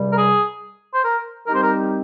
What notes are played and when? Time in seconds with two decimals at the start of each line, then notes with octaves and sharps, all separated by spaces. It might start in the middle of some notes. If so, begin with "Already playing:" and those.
Already playing: C#2 C3 G3
0.12 A#4
0.18 G#4
0.94 C5
1.04 A#4
1.46 D#3 G3 C4 D#4 G4 A#4
1.54 C5
1.62 A#4